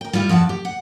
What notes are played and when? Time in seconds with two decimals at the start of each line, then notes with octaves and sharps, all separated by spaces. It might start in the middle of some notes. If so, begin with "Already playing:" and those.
0.01 A#4 G5
0.13 G3 E4 F4 G4
0.29 F2 F3 F#5 A5
0.49 G4
0.65 F#5